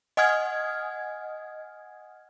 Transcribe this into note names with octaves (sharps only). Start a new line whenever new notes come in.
D#5 F#5 G#5 D#6 F6 G#6